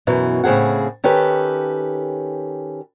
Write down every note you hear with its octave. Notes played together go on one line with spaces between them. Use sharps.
F#2 B2 E3
A2 C#3 C4 G#4 F#5
D#3 C#4 G4 A4 B4